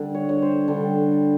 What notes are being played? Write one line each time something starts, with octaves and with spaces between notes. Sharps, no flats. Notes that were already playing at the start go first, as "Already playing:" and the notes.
Already playing: D3 G3
C#5
C#5
C5
D3 G3